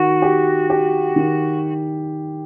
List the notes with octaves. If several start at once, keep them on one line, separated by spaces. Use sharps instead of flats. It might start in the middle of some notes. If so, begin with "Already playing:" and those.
Already playing: D#3 F#4
G4
G4
D#3